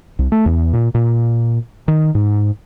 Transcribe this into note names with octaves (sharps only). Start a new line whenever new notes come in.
C2
A3
E2
A#2
A#2
D#3
G#2